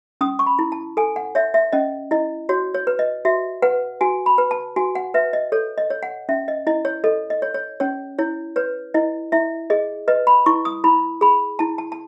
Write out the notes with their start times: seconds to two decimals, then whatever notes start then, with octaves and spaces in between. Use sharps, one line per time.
0.21 C#4 D#6
0.39 C#6
0.47 B5
0.59 E4
0.72 A5
0.97 A4 G#5
1.16 F#5
1.35 C#5 E5
1.54 E5
1.73 C#4 D#5
2.11 E4 D#5
2.49 F#4 C#5
2.75 C#5
2.87 B4
2.99 D#5
3.25 F#4 E5
3.62 B4 F#5
4.01 F#4 G#5
4.26 B5
4.38 B4
4.51 A5
4.76 F#4 G#5
4.95 F#5
5.14 B4 E5
5.33 D#5
5.52 A4 C#5
5.78 D#5
5.90 C#5
6.03 F#5
6.29 C#4 E5
6.48 D#5
6.67 E4 D#5
6.85 C#5
7.04 A4 D#5
7.30 D#5
7.42 C#5
7.54 C#5
7.80 C#4 C#5
8.19 E4 C#5
8.56 B4 C#5
8.94 E4 D#5
9.32 E4 E5
9.70 G#4 D#5
10.08 B4 D#5
10.27 B5
10.46 E4 C#6
10.65 D#6
10.84 E4 B5
11.21 G#4 B5
11.59 E4 A5
11.78 A5
11.92 A5